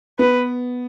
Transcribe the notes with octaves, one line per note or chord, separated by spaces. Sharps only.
B3 B4